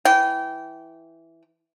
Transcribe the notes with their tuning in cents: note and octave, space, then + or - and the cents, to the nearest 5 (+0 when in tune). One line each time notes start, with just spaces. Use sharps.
E3 +0 G5 -20